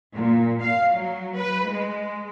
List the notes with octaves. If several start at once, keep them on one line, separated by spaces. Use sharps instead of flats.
A#2
F5
F#3
B4
G#3